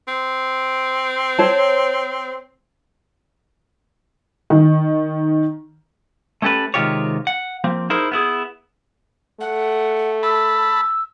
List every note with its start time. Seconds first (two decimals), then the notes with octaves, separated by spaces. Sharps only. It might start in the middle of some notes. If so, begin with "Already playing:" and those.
0.08 C4
1.39 C5 C#5 A5
4.50 D#3
6.42 A3 C#4 G4 A4 B4
6.74 C3 D#3 G#3 F4 G4 C#5
7.27 F#5
7.64 F3 A#3 C4
7.90 D#4 E4 G#4 A#4 C5
8.12 B3 E4 G#4
9.40 A3 F#5
10.23 A5 B5 E6